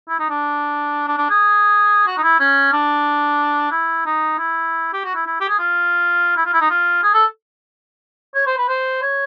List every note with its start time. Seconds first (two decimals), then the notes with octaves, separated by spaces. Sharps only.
0.09 E4
0.19 D#4
0.30 D4
1.07 D4
1.18 D4
1.30 G#4
2.07 F#4
2.17 D#4
2.23 E4
2.40 C#4
2.73 D4
3.72 E4
4.06 D#4
4.38 E4
4.93 G4
5.04 F#4
5.15 E4
5.26 E4
5.40 G4
5.49 G#4
5.59 F4
6.36 E4
6.46 F4
6.53 E4
6.61 D#4
6.70 F4
7.03 G#4
7.14 A4
8.35 C#5
8.47 C5
8.58 B4
8.68 C5
9.02 C#5